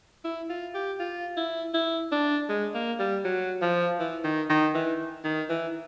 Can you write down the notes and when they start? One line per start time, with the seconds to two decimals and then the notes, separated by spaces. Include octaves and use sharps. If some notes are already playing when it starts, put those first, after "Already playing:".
0.25 E4
0.50 F4
0.75 G4
1.00 F4
1.37 E4
1.74 E4
2.12 D4
2.49 G#3
2.75 A#3
2.99 G3
3.25 F#3
3.62 F3
4.00 E3
4.24 D#3
4.50 D#3
4.75 E3
5.24 D#3
5.50 E3